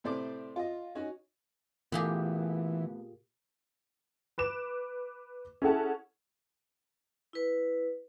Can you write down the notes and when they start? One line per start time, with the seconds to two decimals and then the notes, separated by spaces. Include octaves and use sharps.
0.04 A2 C3 C5 D5 D6
0.56 F4 D#5
0.95 C#4 D#4 F#4
1.92 A#2 E3 A3 B3 G4 G#4
4.38 B4 D6 E7
5.62 C#4 E4 G#4 A4 F#5 A5
7.33 E4 B4